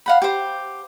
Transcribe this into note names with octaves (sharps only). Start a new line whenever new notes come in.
F5 F#5 B5
G4 C5